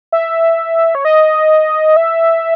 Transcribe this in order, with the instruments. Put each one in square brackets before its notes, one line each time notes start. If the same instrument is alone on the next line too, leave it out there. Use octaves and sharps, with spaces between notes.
[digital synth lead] E5
C#5
D#5
E5